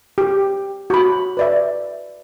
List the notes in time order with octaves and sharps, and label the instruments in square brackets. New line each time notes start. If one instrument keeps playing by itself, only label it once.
[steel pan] G4
F#4 B5
B4 D5 E5